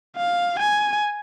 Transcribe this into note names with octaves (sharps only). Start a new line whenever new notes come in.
F5
G#5